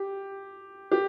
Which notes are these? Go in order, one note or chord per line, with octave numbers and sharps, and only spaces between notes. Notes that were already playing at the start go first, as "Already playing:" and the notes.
Already playing: G4
G4